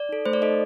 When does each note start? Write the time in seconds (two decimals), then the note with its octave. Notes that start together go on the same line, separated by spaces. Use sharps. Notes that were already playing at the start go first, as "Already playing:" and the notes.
Already playing: D5
0.09 D#4 A4
0.25 A3 C5
0.33 D5
0.42 D#4 A4 D#5